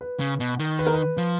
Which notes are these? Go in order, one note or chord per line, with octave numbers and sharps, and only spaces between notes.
B4
C#3
B2
D#3
B4
A#4
B4
F3